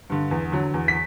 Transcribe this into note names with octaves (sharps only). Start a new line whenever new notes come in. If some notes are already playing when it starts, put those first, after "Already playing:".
G2 D3
E2
D3 F#3
E2
B6